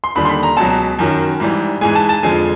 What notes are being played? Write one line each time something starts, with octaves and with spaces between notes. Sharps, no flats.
C6
D#2 D3 G3 B5
C6
B5
A#5
C#2 B2 F#3 A5
F#2 D#3 F#3
G#2 E3 G3
G#2 E3 G#3 G#5
A5
A5
F2 D3 F3 G#3 G#5